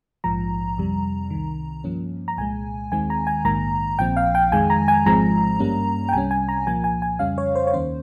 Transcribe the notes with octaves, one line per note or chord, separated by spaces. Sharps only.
A#1 G#2 F3 A#5
F2 C3 G3
C2 C3 D#3
G2 F3 A#3 C#4
A#5
C2 A#2 G#3 G#5
D#2 D#3 G#3 C4 G#5
A#5
G#5
A#1 G#2 D#3 A#3 A#5
A#1 A#2 F3 C4 G5
F5
G5
F2 D#3 G#3 G#5
A#5
G#5
G#1 G#2 F3 G#3 C4 A#5
G2 G3 A#3 C#4
G5
C2 C3 G3 C#4 G#5
G#5
A#5
C2 A#2 F3 A#3 G#5
G#5
G#5
F2 C#3 G3 C#4 F5
C#5
C5
C#5
D#2 D#3 A#3 C#4 C5